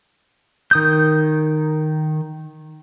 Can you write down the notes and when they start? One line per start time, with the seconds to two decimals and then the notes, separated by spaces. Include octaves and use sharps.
0.71 D#3 D#6 G6